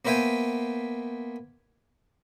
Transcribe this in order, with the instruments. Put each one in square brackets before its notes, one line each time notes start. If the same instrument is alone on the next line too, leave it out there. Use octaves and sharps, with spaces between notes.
[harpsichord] A#3 B3 C5 E5 G5 G#5